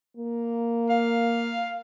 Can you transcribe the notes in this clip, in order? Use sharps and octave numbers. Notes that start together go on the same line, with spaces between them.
A#3
F5